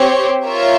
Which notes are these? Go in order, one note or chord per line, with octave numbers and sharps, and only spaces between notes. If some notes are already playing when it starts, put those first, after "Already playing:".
Already playing: C4 G4 C#5
F4 A#4 C#5 E5